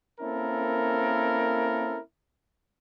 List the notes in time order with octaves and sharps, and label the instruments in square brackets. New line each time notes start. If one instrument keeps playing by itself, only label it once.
[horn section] A#3 C4 C#4 E4 A4 A#4